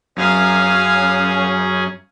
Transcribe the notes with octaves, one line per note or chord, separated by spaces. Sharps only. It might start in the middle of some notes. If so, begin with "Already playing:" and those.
F#2 C#4 G#4 F5 G#5